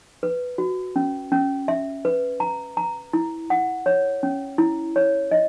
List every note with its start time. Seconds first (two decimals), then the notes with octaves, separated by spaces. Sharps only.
0.23 B4
0.58 F#4
0.96 C#4
1.32 C#4
1.68 E5
2.05 B4
2.40 A#5
2.77 A#5
3.13 E4
3.50 F#5
3.86 C#5
4.23 C#4
4.58 E4
4.96 C#5
5.31 D#5